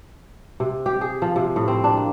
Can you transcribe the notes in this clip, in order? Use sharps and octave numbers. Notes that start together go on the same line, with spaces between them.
C3
G4
G#4
F3
C3
A2
C4
D4
A#3